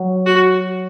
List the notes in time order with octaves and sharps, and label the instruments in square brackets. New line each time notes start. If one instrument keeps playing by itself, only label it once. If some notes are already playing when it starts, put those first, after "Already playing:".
Already playing: [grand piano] F#3
[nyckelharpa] F#4